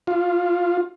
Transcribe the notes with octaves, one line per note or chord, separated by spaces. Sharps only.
F4